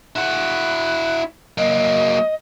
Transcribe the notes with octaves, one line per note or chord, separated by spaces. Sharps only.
E4 F#4 F#6
F#3 A#3 D#5